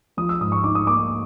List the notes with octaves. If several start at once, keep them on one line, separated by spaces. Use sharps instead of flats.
F3 D#6
E6
G#2 D#6
C#6
D#4 D6
D#6
A#3 D6